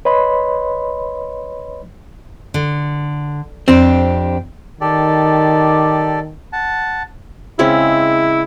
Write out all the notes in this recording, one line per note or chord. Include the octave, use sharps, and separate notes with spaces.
B4 C#5 D#5 B5 C6
D3
F2 C4 D4 G4
D#3 G4 A4 D5
F#5 A5
C#3 G#3 C4 E4